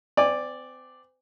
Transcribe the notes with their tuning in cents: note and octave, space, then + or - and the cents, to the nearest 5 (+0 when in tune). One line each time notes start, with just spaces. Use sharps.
C4 -40 D5 +0 G#5 -35